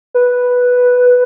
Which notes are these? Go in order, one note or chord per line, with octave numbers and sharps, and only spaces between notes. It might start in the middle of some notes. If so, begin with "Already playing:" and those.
B4